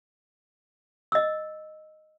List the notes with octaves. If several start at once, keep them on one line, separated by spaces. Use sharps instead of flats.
D#5 E6